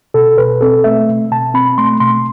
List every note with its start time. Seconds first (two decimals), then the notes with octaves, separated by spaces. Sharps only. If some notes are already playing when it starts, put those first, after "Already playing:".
0.14 B2 A4
0.38 B2 B4
0.61 C4 A4
0.84 A3 E5
1.09 B2
1.31 B2 A5
1.54 C4 B5
1.78 A3 C6
2.00 B2 C6